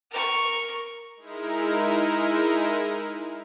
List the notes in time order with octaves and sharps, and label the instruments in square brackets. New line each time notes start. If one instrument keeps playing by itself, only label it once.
[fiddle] A#4 C#6
[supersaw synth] G#3 D#4 E4 A#4